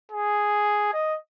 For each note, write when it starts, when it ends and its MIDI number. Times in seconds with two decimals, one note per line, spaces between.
0.12 0.92 68
0.94 1.16 75